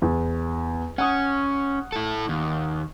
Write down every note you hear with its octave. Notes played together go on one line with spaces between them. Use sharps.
E2
C#4 F#5 D#6
E4 A4
D#2